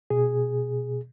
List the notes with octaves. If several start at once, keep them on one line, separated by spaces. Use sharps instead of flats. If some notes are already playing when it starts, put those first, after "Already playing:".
B2 G#4